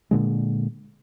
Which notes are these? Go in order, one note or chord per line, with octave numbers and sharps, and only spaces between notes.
A#2 D3 G#3